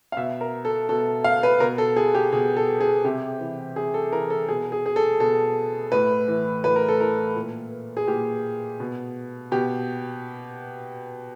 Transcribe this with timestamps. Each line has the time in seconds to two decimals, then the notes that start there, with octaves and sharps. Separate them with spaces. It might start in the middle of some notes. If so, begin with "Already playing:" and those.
0.12 F5
0.17 B2 E5
0.41 A#4
0.65 A4
0.89 B2 A4
1.24 F5
1.43 B4
1.60 B2 A#4
1.78 A4
1.96 G#4
2.15 G4
2.32 B2 G#4
2.57 A4
2.81 G#4
3.04 C3 G4
3.40 E3
3.76 C3 G#4
3.94 A4
4.12 E3 A#4
4.30 A4
4.49 B2 G#4
4.72 G#4
4.86 G#4
4.96 A4
5.20 B2 A4
5.92 A2 B4
6.28 E3
6.64 A2 B4
6.76 A#4
6.88 A4
7.00 E3 A#4
7.36 A#2
7.97 G#4
8.08 A#2 G4
8.80 B2
9.52 B2 G4